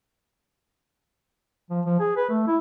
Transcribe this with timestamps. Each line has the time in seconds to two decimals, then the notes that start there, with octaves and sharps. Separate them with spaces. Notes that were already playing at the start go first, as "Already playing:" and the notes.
1.70 F3
1.85 F3
2.00 G#4
2.16 B4
2.30 A3
2.47 E4